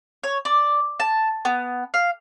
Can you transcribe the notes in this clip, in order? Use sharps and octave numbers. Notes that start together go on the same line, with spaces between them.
C#5
D5
A5
B3
F5